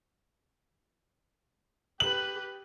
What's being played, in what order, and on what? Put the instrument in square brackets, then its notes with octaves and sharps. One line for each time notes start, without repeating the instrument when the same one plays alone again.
[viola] G4 B4 [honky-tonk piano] F#7